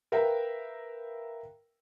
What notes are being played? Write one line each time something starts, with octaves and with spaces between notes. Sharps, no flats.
A#4 B4 E5 F5 G5 A#5